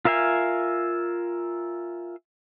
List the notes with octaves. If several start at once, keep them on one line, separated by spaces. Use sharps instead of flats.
F4 A#4 E5 F5 G#5